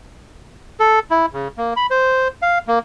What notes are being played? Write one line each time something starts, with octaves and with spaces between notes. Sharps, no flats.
A4
E4
C#3
A#3
B5
C5
F5
A#3